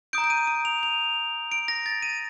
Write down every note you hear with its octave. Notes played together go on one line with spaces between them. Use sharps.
A#5 D#6 G6 D7
D7
D#7
D#7
F7
F7
D7
A#6
A6
D#7